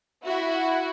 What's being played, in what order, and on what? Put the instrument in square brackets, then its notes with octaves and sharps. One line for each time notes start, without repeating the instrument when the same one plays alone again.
[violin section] E4 F#4